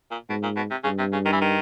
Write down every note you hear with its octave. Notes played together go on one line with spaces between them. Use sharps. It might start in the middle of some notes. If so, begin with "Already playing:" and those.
A#2
G#2 B2
A#2
B2
C3
G2 C#3
C3
C#3
D#3
E3
D#3